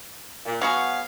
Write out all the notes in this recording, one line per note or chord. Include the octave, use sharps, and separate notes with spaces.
A#2
F#3 B3 F#4 G#4 F5